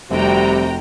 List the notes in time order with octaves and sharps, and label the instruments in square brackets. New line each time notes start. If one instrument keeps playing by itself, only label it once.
[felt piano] F1 [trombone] C3 [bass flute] G3 [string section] F#4 G5 A#5